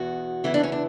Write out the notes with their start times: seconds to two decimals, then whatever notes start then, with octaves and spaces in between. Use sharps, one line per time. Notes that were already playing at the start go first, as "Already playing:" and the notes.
Already playing: E2 B2 F#4
0.44 E2 C#3 E3 E4
0.54 D4
0.63 C#4
0.72 D4